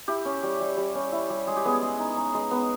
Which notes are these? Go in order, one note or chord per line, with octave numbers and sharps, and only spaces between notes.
E4 G4
C#4
G3
G3
G3
C#4
E4
G3
G#3 G#4
G4
B3 G#4
G#3
D#4
D#4
G#3
B3